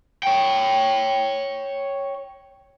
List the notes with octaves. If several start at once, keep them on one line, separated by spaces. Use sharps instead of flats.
C#5 G5